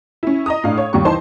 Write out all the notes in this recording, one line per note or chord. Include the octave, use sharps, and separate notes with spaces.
C#4 E4
D#5 A#5 D#6
A2 D4 F5
C#5
D#2 G3 C#6
E3 D#4 C5 A5 C6